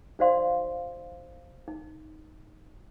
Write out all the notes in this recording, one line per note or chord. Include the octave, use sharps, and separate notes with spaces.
D#4 F#4 C5 D5 F5 C6
D#4